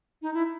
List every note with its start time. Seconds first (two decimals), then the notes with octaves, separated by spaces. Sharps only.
0.22 D#4
0.34 E4